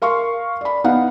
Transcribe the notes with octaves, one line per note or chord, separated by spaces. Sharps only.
A#4 F5 C6 C#6
D5 B5
B3 D#4 F5 F#5